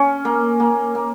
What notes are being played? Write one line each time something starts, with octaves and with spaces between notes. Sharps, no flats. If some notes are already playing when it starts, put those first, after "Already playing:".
Already playing: C#4
A#3
A#3
A#3